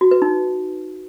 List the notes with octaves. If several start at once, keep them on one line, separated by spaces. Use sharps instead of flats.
F#4
B4
D#4